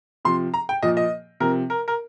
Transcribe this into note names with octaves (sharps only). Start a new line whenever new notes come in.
C3 F3 C6
A#5
G5
A#2 F3 D#5
D#5
C3 F3 A#4
A#4
A#4